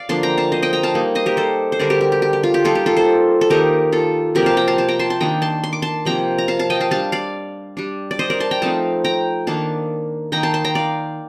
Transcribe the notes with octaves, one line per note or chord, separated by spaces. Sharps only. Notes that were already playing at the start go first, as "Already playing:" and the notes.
Already playing: D5 F5
D3 F3 A#3 D4 A5 C6
G5 A#5
F5 A5
C5 D#5
D#5 G5
G5 A#5
F5 A5
G3 A#3 D#4
C5 D#5
G4 A#4
A4 C5
C5
D3 G3 D4 A#4 D5
G4 A#4
G4
G4
G4
G4
F4
G4
G3 A#3 D#4 F4 A4
G4
F4 A4
A4 C5
A4
D#3 A#3 D#4 G4 A#4
F4 A4
C3 F3 A#3 G4 A#4
F5 A5
G5 A#5
F5 A5
F5 A5
G5 A#5
A5 C6
A5 C6
D#3 A#3 D4 G5 A#5
A5 C6
C6
D6
A5 C6
C3 F3 A#3 G5 A#5
A#5
F5 A5
F5 A5
D#5 G5
F5 A5
G3 D4 F5 A5
D5 F5
G3 D4
D5
C5 D#5
A#4 D5
A5 C6
G5 A#5
F3 A3 C4 D#4 F5 A5
G5 A#5
D#3 A#3 D4 F5 A5
D#3 A#3 D#4 G5 A#5
A5 C6
A5 C6
G5 A#5
D5 F5